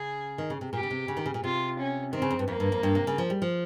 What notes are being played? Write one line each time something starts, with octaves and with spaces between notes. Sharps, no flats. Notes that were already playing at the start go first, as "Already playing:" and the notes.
Already playing: C#3 G#4
D#3
C#3
C3
A#2 G4
C#3
C3
C#3
D#3
C#3
A#2
C3 F4
C#4
D#3 C4
C#3
F2
G2
F2 A#3
G2
F2
G2
C3
C#3
F3
G3
F3